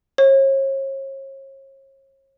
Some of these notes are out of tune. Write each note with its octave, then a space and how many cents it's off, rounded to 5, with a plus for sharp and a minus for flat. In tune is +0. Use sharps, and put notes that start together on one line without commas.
C#5 -40